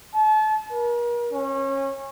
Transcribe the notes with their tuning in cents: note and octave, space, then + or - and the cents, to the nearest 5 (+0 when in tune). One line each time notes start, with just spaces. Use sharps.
A5 -35
A#4 +40
C#4 -25